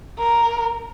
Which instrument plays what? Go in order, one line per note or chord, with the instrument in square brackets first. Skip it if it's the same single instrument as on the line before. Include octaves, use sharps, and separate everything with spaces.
[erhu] A#4